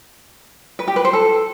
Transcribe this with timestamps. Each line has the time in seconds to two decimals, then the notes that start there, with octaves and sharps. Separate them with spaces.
0.79 B4
0.88 G4
0.96 B4
1.05 C5
1.13 A4